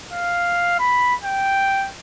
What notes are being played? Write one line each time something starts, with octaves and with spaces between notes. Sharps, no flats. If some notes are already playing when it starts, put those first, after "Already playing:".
F5
B5
G5